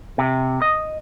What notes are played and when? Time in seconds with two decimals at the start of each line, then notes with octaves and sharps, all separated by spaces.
0.18 C3
0.62 D#5